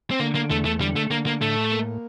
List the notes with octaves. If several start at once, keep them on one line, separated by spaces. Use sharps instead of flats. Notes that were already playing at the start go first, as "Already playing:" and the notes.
C4
D3 A#3
A#3
E2 A3
A3
D3 G3
A3
D3 A#3
A#3
A2 A3
A#3